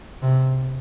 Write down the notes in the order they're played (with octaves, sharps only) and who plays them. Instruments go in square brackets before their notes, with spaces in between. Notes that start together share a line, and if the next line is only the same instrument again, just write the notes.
[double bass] C3